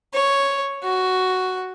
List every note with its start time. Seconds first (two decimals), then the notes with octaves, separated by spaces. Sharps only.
0.14 C#5
0.84 F#4